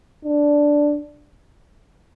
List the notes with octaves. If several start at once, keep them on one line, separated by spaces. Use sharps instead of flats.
D4